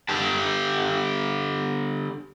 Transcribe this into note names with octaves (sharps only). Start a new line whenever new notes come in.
D3 G4 A5